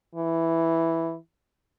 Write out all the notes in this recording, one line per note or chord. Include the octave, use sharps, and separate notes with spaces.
E3